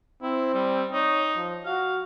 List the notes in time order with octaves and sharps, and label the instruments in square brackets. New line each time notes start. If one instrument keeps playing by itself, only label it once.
[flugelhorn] C4 [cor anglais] E4
[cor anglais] G3
[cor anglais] D#4 [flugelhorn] C#5
[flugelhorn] F3
[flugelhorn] F#4 [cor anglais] F5